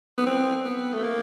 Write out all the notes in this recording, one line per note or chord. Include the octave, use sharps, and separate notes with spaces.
B3
C4
B3
A3
A#3